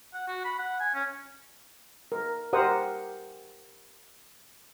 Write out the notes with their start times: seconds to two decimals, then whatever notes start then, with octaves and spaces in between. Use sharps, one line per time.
0.14 F#5
0.28 F#4
0.45 B5
0.59 F#5
0.80 G#5
0.94 C#4
2.12 A#4
2.53 G4 A#4 C5 F#5 A#5 D#6